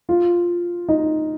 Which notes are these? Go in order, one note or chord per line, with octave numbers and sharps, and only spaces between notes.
F4
D#4